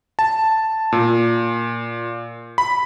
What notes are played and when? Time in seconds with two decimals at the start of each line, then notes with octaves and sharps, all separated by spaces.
0.19 A5
0.92 A#2
2.58 B5